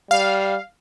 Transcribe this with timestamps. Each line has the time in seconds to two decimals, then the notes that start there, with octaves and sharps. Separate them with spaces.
0.11 G3 F5